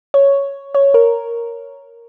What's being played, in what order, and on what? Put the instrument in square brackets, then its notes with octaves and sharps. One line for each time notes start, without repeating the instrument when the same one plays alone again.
[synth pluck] C#5
C#5
A#4